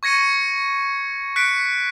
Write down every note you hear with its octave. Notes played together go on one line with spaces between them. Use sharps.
C#6 G#6 A#6 C#7 D#7
F#6 B6 C#7 D7